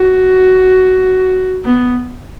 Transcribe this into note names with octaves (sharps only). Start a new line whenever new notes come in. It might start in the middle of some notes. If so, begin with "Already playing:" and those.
Already playing: F#4
B3